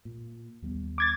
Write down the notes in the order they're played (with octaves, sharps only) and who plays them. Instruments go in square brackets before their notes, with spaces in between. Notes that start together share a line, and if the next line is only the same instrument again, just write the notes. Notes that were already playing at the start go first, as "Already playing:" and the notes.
[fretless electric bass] A#2
D#2 G3 B3
[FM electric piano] D6 G#6 A6